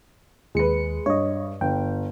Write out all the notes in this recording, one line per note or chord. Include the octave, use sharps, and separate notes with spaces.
D#2 G#3 B4 C#7
G2 C#5 D#5
G1 G5